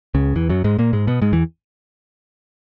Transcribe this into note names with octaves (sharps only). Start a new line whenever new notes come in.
C#2 C#3
E2 E3
F#2 F#3
G#2 G#3
A#2 A#3
G#2 G#3
B2 B3
G#2 G#3
E2 E3